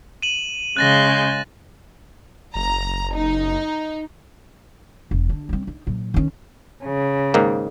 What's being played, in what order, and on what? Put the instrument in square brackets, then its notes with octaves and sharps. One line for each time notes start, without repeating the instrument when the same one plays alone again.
[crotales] D#7 E7 F#7
[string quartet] C#3 G#3 G6 [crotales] F#6 A6 A#6
[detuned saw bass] F#1 [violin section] A#5
[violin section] D#4
[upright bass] E1
D3
G3 C4
D#4
A#2 F#3
D#3 C#4
[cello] C#3
[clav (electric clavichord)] G#2 D#3 A#3